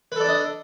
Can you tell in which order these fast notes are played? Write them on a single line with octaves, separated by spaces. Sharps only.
B4 A4 D5 D4 D#5